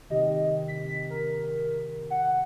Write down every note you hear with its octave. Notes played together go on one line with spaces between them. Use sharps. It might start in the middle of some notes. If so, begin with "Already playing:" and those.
C3 D#3 G4 D#5
B6
A#4
F#5